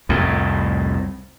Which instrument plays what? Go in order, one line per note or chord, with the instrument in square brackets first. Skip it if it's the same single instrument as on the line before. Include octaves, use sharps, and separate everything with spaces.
[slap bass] C2 F2 A2